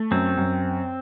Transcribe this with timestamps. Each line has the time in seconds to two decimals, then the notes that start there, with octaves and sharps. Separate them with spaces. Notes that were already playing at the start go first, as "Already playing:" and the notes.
Already playing: A3
0.11 F#2 C4
0.37 F#2